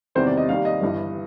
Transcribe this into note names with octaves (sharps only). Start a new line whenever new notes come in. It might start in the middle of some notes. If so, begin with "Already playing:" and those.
E2 C3 D#3 G3 C4 C5
D5
D#5
D#2 D#3 G3 F5
D#5
G1 G2 E3